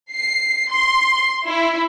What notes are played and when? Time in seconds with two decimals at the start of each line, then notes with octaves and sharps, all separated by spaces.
0.15 C7
0.72 C6
1.48 E4